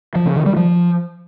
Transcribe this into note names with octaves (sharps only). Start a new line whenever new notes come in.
F3
C#3
D#3
G3
F3